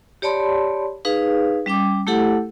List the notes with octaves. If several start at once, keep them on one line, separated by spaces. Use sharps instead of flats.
G4 C#5 D5 A5 B5 C6
D#4 G#4 B4 F5
G3 C#4 G5 D6
A3 E4 G4 A4 F#5